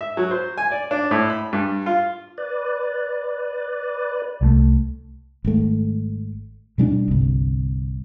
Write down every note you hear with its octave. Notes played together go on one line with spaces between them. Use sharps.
E5
F#3
C5
G#5
D5
D4
A2
B5
G2
F4
B4 D5
C2 F#3 A3
G#1 A3
B2 G3 C#4 D4
G1 C2